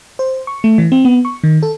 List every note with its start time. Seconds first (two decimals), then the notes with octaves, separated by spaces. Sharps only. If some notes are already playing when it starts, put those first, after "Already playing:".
0.19 C5
0.47 C#6
0.64 A3
0.78 E3
0.92 C4
1.05 B3
1.25 C#6
1.44 D#3
1.63 A4